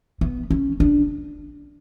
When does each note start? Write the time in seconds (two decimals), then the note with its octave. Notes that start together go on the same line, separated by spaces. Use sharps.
0.21 B3
0.50 C#4
0.80 D4